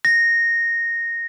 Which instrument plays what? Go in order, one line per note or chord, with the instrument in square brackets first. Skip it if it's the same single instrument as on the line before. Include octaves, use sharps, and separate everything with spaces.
[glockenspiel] A#6